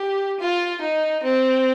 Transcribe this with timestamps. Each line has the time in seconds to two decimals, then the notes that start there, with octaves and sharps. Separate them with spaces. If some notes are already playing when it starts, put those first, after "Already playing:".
Already playing: G4
0.40 F4
0.81 D#4
1.23 C4